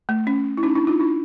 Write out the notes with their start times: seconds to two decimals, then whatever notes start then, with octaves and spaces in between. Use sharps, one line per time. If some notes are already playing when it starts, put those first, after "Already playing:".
0.09 A3
0.27 C#4
0.57 E4
0.63 C#4 D#4
0.75 D4 E4
0.87 D#4 F4
1.00 D4 E4